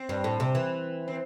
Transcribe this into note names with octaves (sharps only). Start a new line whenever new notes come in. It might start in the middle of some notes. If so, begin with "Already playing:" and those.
Already playing: C4
G2
A2
C3
E3
C4